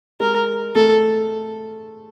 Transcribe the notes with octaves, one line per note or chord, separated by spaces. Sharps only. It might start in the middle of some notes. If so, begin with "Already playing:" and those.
G#3 A#4
A3 A4